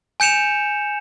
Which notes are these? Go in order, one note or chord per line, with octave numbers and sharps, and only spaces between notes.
G#5 G6 C#7 E7 F7